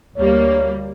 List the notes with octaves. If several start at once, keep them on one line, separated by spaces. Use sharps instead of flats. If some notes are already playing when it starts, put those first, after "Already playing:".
D2 G3 A#3 C#5